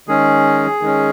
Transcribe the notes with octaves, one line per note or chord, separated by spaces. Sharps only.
D#3 G#3 C#4 G#4
D#3 G#3 C#4